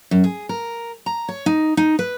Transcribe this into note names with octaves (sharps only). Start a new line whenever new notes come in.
F#2
G#4
A#4
A#5
C#5
D#4
D#4
B4